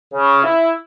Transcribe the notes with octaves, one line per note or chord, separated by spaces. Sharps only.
C#3
E4